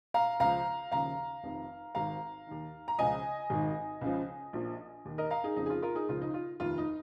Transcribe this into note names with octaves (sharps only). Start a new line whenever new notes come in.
F5 A#5
C#2 C#3 F3 F5 A#5
D#2 C#3 F3 F5 A#5
F1 F2 D#3
G#1 G#2 D#3 F5 A#5
D#2 D#3
A#5
C#2 C#3 F3 D#5 G#5
G#1 G#2 D#3
C#2 C#3 F3
A#1 A#2 F3
D#2 D#3
A#4 D#5
F5 A#5
D#4 G#4
F1 F2 C#3 F3 D#4
G#4
F4
F4 A#4
D#4 G#4
C#2 C#3 F3 F4
D#4
F4
F1 D#2 D#3 F4
D#4